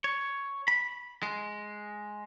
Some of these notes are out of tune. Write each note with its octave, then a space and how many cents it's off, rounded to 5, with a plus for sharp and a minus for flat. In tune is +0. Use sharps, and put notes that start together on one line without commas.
C#5 +5
B5 -10
G#3 +5